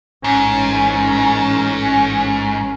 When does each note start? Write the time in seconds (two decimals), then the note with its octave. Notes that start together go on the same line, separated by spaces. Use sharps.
0.24 A1 G#2 C#4